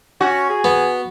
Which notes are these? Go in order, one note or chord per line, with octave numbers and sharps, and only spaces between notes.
C#4 F#4
G#4
B3